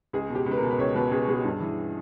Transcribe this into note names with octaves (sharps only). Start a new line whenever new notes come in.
C#2 G#4
B2
G4
C#2
B4
A#4
B2
B4
C#2 C#5
B2 B4
C#2 G#4
B2 G#4
G2
E3